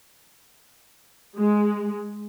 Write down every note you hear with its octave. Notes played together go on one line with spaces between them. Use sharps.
G#3